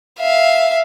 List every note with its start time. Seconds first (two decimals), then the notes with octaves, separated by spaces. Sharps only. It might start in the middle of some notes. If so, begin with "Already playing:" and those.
0.19 E5 F5